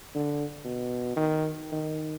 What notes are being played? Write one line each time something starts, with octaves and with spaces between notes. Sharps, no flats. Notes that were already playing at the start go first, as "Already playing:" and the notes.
D3
B2
D#3
D#3